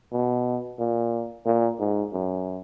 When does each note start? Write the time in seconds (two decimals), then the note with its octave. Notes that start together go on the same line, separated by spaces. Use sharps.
0.13 B2
0.79 A#2
1.46 A#2
1.80 G#2
2.13 F#2